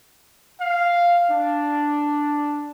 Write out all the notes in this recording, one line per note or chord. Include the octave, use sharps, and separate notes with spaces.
F5
D4